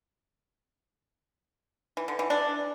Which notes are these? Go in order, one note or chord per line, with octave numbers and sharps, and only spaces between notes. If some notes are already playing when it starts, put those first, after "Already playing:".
E3
D3
E3
D4